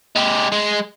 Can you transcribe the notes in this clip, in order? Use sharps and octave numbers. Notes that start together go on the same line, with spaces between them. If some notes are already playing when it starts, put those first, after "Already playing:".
G#3 G4
G#3 G#4